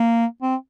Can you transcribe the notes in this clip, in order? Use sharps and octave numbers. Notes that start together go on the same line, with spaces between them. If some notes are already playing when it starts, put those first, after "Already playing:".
Already playing: A#3
C4